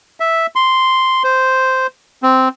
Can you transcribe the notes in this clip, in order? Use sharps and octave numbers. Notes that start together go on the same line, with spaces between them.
E5
C6
C5
C4